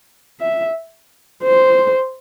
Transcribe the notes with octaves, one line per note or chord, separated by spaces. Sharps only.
E5
C5